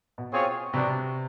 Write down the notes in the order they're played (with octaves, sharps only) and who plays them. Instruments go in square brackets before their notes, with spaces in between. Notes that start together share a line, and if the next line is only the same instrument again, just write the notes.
[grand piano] B2
[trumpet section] C4 F4 G#4 C#5
[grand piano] C3 [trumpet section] G3 B3 D4 F#4